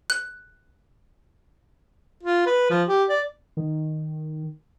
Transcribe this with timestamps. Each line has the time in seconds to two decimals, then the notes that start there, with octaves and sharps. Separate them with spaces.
0.10 F#6
2.23 F4
2.46 B4
2.70 F3
2.88 G4
3.09 D5
3.57 D#3